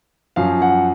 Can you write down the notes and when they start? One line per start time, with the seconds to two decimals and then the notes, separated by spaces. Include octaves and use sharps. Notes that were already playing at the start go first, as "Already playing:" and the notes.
0.36 F#2 F3 F5
0.62 F#5